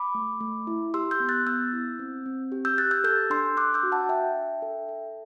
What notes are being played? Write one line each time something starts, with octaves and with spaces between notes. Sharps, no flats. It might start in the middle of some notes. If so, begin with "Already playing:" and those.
Already playing: B5 D6
A3
A3
E4
G4 C6 E6
E6 G6
B3
F#6 A6
B3 E6 G6
E4
C4
C4
G4
E6 G6
G4 F#6 A6
E6 G6
A4 E6 G6
D4 C6 E6
D4 D6 F#6
E6 G6
F#4
F#5 A5
D4 E5 G5
D4
A4
A4